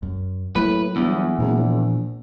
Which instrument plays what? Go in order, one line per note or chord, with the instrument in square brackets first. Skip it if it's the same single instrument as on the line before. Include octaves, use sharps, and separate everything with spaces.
[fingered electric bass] F#2
[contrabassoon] A2 [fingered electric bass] F#3 A#3 [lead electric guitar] B4
[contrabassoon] G1 [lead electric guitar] E2
[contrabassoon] F#1 [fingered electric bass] A#2
[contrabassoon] A#1